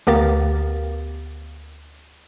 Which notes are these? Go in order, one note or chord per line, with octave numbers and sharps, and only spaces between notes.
D2 B3 G4 A#4 F5 A6